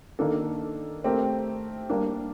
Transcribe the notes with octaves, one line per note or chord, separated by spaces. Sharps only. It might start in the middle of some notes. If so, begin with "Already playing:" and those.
D#3 A#3 D4 A4
A3 C4 G4 A#4
G3 A#3 D4